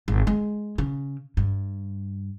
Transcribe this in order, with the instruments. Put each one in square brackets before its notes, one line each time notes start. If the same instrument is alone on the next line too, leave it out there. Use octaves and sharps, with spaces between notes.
[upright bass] G#1
G#3
C#3
G2